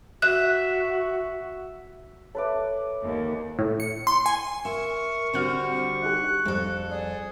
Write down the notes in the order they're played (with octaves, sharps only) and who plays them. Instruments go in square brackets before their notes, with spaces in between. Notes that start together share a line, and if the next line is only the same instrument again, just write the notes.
[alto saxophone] F#4 [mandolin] E5 [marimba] F#6
[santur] A4 B4 D6 [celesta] C#5 E5
[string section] D#2
[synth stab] A2
C#7
C6
G#5
[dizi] A#4 [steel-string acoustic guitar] E5 [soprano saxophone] C#6
[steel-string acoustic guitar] D3 G3 F#4 [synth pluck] C4 F6 [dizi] C5
[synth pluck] D#4 G4 [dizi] F#6
[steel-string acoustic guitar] F2 A4 [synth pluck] G3
[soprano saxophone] G#4 [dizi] D5